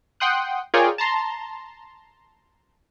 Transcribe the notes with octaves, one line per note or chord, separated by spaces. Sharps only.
F#5 G5 C6 D#6 F#6
F4 G#4 A#4 C#5 D5 G5
A5 A#5 C6